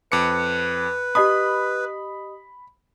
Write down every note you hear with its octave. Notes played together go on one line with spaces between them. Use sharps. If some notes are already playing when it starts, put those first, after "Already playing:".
F2 B4 D6 C#7
G4 D#5 B5 D#6